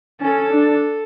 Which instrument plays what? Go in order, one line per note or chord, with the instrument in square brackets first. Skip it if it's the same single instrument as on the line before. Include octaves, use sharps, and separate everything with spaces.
[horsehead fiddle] C#4 [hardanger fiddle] A4
[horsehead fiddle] D4